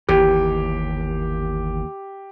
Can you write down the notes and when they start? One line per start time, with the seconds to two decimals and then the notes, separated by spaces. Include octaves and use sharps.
0.09 G1 D#2 E3 G4